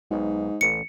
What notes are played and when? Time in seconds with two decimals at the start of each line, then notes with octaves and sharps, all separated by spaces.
0.11 B1 G#2
0.61 A1 C#7